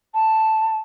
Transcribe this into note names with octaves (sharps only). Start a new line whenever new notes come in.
A5